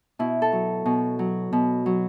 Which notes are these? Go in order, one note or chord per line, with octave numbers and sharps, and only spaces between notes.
B2 E4
A4
F#3
B2
F#3
B2
F#3